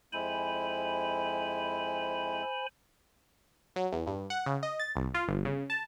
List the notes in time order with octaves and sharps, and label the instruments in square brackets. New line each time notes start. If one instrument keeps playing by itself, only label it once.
[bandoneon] F2 G#3 E4 [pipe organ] C5 G#5 B5
[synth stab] F#3
E2
G2
F#5
C#3
D#5
A6
C2
F4
G1
C#3
A5